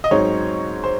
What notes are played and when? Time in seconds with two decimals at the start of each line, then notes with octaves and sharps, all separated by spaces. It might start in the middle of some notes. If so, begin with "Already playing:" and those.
0.04 D#5
0.11 G#2 F#3 C4 D#4 C#5
0.84 C5